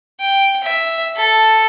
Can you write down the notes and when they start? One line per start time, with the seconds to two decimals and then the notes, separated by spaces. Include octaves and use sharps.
0.20 G5
0.64 E5
1.16 A4